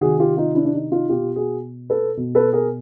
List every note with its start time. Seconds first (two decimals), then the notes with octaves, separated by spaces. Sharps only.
0.01 C3 D#3 F#4 G#4
0.20 F4 G4
0.37 D#4 F4
0.55 D4 E4
0.65 D4
0.74 D#4
0.92 D#4 F4
1.09 B2 F4 G4
1.36 F#4 G#4
1.90 A4 B4
2.17 B2
2.35 A4 B4
2.53 G#4 A#4